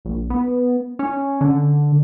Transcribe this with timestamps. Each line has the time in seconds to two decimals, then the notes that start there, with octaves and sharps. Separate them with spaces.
0.05 A#1
0.30 B3
0.99 C#4
1.41 D3